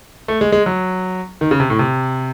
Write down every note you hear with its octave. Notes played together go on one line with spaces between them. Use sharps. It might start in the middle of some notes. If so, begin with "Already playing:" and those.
A3
G#3
G#3
F#3
D#3
C#3
C3
A2
C3